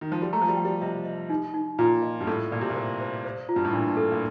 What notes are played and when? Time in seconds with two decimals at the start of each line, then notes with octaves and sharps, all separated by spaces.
0.01 D#3
0.12 F3
0.22 G3
0.33 A3 A#5
0.42 F3
0.49 G3
0.57 G5
0.65 G3
0.82 C3 D#5
1.05 D#5
1.30 D#4
1.54 D#4
1.79 A#2 F4
2.02 D#5
2.20 G2
2.27 A2 A4
2.52 A#2 D5
2.61 C3
2.70 A#2
2.76 C5
3.01 C5
3.25 C5
3.49 F4
3.56 G2
3.65 A2
3.73 A#2 D4
3.97 A4
4.12 A#2